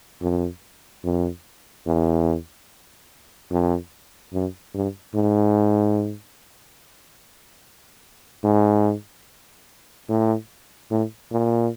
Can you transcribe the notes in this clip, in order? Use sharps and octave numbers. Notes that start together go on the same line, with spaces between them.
F2
F2
E2
F2
F#2
G2
G#2
G#2
A2
A2
A#2